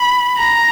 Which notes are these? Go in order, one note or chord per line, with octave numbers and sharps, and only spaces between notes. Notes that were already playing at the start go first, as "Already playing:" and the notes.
Already playing: B5
A#5